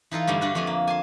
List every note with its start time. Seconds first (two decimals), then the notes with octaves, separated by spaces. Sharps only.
0.11 E3 D#4 F4 A4
0.27 G2 D3 G3 A3 G#5
0.41 D3 D4 F#4 B4
0.55 F2 A3 G#5
0.67 A#3
0.87 G#5 A5 C6